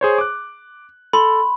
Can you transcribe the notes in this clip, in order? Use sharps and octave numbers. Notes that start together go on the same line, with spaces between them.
G#4 C5 C#5
D6 F#6
A4 B5 C6